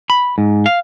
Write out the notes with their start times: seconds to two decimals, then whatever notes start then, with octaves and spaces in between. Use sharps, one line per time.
0.10 B5
0.38 G#2
0.66 F5